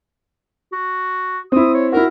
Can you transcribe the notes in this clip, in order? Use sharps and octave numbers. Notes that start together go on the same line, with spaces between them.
F#4
C4 E4 D#6
C#5
E4 F#4 A#4